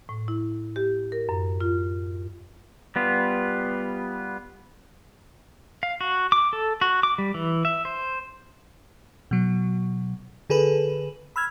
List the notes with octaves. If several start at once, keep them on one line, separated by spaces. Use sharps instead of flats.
A2
E4
G4
A#4
F#2
F4
G3 B3 F4
F5
F#4
D6
A4
F#4
D6
G3
E3
E5
C5
B2 F#3
D3 G#4 A4 B4
B5 E6 F6 G#6